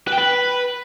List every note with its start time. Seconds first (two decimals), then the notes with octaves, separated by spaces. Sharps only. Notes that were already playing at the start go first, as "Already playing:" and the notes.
0.07 B4
0.13 G5
0.18 B4